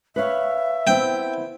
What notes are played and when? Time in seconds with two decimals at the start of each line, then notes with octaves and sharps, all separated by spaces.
0.16 B4 C#5 E5 F5
0.87 B3 C4 E4 G5